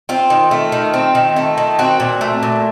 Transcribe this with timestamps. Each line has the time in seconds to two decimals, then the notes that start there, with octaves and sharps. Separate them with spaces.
0.09 C4 F4
0.30 D#3
0.51 A3
0.72 D#3
0.94 C4
1.15 D#3
1.36 A3
1.57 D#3
1.79 C4 F#4
2.00 A#2
2.21 A3
2.43 A#2